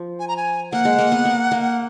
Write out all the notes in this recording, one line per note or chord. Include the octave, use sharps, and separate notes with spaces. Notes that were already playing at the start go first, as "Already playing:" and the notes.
Already playing: F3
G#5
A#5
G#5
A#3 F#5
G#3
A#3
B3
A#3
A#3